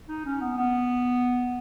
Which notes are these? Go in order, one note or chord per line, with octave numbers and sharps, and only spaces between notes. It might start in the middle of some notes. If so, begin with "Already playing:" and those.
D#4
C#4
B3
B3